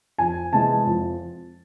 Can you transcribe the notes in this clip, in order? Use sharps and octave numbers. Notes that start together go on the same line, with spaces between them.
F2 G#5
C3 E3 G#3 A5
F2